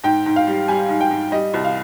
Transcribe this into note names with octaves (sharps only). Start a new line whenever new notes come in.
G#2 G5
G#2
F5
G3
G3 G#5
G#2
G5
G#2
G3 D#5
C2
F5